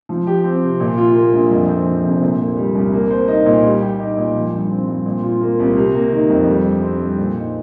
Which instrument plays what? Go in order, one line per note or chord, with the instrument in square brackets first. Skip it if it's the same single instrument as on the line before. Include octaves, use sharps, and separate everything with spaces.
[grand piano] F3
G4
C4
C3
A#2
F4
A#3
A#1
F2
C4
F3
F1
A#2
A#3
G3
C2
A#3
C5
D#4
A#2
G3
G4
D#4
A#2
F3
G2
C4
G2
A#2
F4
A#3
C2
C3
A#3
D#3
F2
G3
G2
C4
G2
A#2
D#4